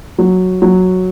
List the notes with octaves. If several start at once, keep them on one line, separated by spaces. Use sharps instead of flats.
F#3
F#3